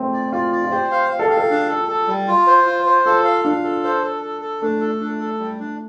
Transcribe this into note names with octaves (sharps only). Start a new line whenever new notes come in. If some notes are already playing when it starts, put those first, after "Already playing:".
Already playing: A3 C4
D5
F4 D5
D5
F4
G4 C5
F5
F5
A4
G4 F5
A4
D4
A4
A4
G3
F4
C5
F4
C5
F4 A4
F5
D4 F5
A4
C5
A4
A4
A4
A3 D4
A4
D4
A4
G3
D4